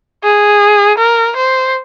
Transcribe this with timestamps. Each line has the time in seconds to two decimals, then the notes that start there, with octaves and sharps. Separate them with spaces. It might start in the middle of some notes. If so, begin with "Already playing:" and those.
0.24 G#4
0.98 A#4
1.36 C5